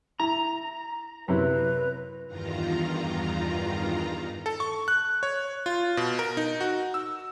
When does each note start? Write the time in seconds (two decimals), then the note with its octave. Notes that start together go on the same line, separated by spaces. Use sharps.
0.20 E4 A#5
1.28 F#2 C3 E4 B4
2.27 E2 G2 D#3 F4 A#5
4.46 A4
4.60 C#6
4.88 F#6
5.23 C#5
5.66 F4
5.97 B2
6.19 A#4
6.37 D#4
6.61 F#4
6.94 E6